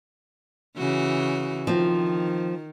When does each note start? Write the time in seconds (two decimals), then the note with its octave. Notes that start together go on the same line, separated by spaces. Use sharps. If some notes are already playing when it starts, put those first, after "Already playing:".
0.77 C#3 E3 F#4
1.67 D#3 F3 C4